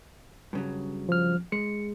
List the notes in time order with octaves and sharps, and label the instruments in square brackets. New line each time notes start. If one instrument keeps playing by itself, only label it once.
[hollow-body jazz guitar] G2 C#3 F#3
[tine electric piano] F3 F6
[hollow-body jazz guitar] G#3 [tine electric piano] C#7